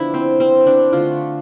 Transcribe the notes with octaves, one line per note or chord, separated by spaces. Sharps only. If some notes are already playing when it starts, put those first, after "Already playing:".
Already playing: D3 F3 B3 D4 E4
C4
C4
D4
D3 A3 F4